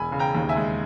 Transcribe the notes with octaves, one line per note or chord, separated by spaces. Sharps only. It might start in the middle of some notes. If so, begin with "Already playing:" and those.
Already playing: E1 G#5 B5
C#3
G5 A#5
D#2
E5 G#5
G#3